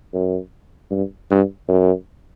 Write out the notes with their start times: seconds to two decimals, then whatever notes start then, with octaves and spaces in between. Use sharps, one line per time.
0.14 F#2
0.91 G2
1.31 G2
1.68 F#2